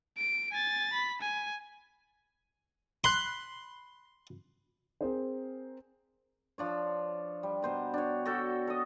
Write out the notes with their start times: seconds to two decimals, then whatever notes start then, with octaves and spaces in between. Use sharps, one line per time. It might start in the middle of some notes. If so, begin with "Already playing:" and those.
0.17 D7
0.52 G#5 A6
0.93 B5
1.21 G#5
3.04 B5 C6 F#6
5.01 C4 G#4 A#4 C5
6.58 F3 D4 C#5
7.43 G3
7.62 B2 C5 A#5
7.94 D4 C#5
8.26 F#4 A4 G5
8.67 A4 D#5